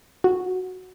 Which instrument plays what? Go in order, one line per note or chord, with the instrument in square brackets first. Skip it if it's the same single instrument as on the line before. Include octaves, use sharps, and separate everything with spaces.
[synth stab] F#4